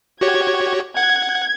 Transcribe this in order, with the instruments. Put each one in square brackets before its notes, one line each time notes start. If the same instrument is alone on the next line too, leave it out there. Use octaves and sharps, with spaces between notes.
[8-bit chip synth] F#4 G4 C#5 [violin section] G#6
[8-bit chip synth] F#5 [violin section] G#6